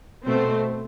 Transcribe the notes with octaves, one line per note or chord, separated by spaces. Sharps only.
B2 A3 C4 C5